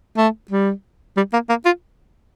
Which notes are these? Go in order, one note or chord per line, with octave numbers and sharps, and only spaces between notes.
A3
G3
G3
A#3
A#3
F4